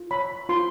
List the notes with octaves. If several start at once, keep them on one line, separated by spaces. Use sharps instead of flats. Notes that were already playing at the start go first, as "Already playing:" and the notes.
Already playing: F4
C#5 B5
F4 C6